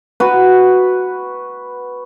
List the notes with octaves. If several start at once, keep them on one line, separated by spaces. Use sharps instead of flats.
F#4 B4